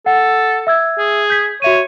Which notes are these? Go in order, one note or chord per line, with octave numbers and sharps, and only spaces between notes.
A4 F#5
E5 E6 G#6
G#4
G6 G#6 B6
F#4 C#5 E5 D#7